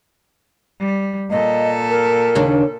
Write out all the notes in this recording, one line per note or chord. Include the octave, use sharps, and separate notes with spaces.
G3
A#2 A4 D#5
A#4
D#2 C#3 D4